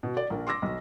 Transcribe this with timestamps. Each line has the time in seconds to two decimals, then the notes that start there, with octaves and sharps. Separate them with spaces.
0.03 B2
0.17 D5
0.30 A#1 A#4
0.47 C6 D6 E6 A#6
0.62 B1